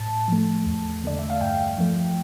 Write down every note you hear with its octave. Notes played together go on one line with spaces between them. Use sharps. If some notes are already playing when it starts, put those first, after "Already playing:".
Already playing: A2 A5
F3 A3
E2
D3 A3 D5
E5
F5
G2 G5
F3 A3